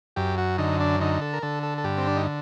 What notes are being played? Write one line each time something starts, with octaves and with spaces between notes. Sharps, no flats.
F#2 G4
F#4
D3 D#4
D4
D3 D#4
A4
A#4
D3 A4
A4
A4
G2 G4
C4
D4
D#4